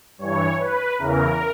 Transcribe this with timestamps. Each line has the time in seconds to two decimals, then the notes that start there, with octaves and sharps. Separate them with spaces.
0.18 G2 E3 C#5
0.58 B4
0.98 E2 C#3 E3 A#4